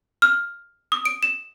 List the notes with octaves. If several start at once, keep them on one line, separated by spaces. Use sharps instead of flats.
F6
D#6
D7
E7